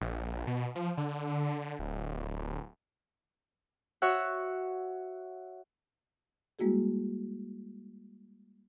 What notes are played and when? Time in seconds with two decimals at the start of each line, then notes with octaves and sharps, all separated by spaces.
0.01 A#1
0.47 B2
0.75 F3
0.97 D3
1.79 D1
4.02 F#4 C#5 E5 F#5
6.59 G3 G#3 A#3 E4 F#4 G#4